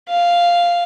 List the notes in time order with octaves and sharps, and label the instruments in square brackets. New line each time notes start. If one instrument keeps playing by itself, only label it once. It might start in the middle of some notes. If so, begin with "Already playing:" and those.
[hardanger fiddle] F5